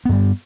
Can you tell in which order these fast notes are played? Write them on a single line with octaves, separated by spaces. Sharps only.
B3 G2 G3